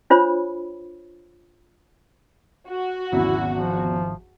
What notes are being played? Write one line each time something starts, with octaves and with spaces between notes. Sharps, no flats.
D4 F4 C5 C#5 B5
F#4
G#1 E2 C#3 F#3 E4 E5
F3